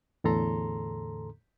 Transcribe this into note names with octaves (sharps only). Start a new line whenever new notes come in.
E2 A2 D3 A4 A#5 C6